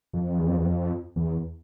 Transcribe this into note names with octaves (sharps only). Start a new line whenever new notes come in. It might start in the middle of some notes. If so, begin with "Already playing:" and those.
F2
E2
F2
E2
F2
E2